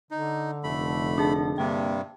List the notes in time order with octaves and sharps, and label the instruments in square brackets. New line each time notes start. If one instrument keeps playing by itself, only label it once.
[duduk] D3 [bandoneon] D#4
[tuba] F1 [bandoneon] A3 B5
[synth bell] D4 G#4 A5
[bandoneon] G2 C3 G3 [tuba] A#3 [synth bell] G5